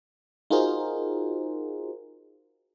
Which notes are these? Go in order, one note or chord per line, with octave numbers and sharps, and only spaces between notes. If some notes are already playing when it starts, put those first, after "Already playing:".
D#4 F4 F#4 G#4 A#4 C5